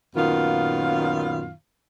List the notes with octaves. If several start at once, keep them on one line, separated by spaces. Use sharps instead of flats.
F#2 A#2 D#3 B3 F4 F5